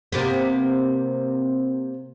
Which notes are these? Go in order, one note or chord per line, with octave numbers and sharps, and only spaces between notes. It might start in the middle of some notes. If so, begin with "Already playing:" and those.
C3 A#3 B3